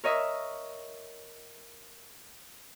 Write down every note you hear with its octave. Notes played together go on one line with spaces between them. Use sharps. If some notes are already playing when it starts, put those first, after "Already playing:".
A#4 C#5 D#5 E5